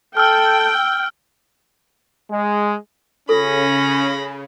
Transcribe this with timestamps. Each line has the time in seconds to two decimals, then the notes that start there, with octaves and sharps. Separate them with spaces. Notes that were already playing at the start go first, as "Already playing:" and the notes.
0.17 A4 G5 E6 F6
2.31 G#3
3.29 C#3 C#4 F4 A4 B5 A#6